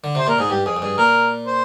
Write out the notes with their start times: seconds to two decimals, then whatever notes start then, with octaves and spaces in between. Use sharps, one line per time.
0.04 D3
0.15 C3 C5
0.27 A#2 A#4
0.39 G#2 G#4
0.50 G2 G4
0.66 F2 G#4
0.77 F2
0.82 G2 G#4
0.98 A#2 A#4
1.47 C5